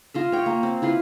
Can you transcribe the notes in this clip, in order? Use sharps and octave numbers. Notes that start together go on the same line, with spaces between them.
F4 D#5 E5
C#5 G5
A#3
C4
E4 F4 B4 C6